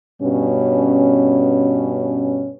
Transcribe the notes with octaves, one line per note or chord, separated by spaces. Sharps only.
G2 B2 C#4